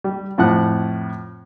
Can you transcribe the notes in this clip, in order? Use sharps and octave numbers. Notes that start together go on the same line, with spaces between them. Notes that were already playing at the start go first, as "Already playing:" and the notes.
G3
F2 A2 F3 F#5 F#6